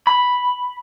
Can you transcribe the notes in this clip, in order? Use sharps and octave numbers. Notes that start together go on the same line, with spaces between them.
B5